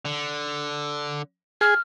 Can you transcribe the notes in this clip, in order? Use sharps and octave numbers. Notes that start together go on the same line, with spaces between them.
D3
G#4 F6